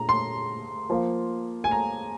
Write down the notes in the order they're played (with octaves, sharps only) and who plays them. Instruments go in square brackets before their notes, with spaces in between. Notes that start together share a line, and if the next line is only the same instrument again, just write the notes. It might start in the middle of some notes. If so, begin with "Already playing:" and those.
Already playing: [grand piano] A#2 G#3 D4 [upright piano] A#5
[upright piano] C6
[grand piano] F3 A#3 F4
[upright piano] G#5
A#5